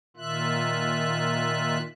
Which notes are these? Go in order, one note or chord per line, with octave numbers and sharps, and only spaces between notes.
A#2 D#3 F4 E5 F#6